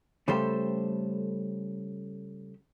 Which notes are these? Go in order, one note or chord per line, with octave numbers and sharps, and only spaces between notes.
C#3 G3 A3 G4 A4 C5